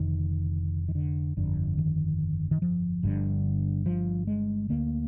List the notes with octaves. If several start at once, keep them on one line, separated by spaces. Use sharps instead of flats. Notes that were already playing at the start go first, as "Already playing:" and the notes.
Already playing: F1 F2 D3 D#3
D#3
D3
G1 F2 D3
D#3
D#3
F3
G1 G2 D3
F3
G#3
D2 D3 A#3